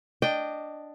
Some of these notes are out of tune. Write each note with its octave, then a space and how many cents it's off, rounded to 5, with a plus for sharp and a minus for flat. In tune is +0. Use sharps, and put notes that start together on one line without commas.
D4 +0 D#5 -10 G5 +0